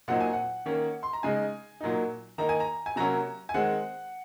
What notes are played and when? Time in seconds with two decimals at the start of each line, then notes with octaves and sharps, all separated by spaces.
0.08 A#2 F#3 C4 D#4 F#5
0.20 G#5
0.33 F#5
0.66 D#3 A#3 C#4
1.03 C6
1.13 A#5
1.23 C#3 G#3 D#4 G#5
1.80 A#2 F#3 A#3 D#4
2.38 D#3 A#3 D#4 A#5
2.49 G#5
2.60 A#5
2.86 G#5
2.96 C3 F#3 A#3 C#4 A#5
3.49 G#5
3.54 D#3 G#3 C4 F#5